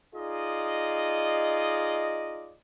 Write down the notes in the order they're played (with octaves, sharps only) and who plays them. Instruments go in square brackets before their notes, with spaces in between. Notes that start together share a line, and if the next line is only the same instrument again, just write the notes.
[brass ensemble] D#4 F4 G#4 D5 D#5